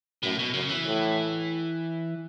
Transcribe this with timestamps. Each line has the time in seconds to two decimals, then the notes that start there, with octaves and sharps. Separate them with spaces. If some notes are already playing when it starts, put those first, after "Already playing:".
0.23 F#2 A2
0.39 B2
0.53 F#2 C#3
0.69 E3
0.84 A2